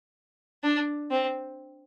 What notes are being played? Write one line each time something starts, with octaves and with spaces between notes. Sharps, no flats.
D4
C4